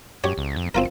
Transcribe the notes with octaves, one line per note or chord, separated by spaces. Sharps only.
F#2 G4 C#5
C#2
F2
G1 C4 F4 A#4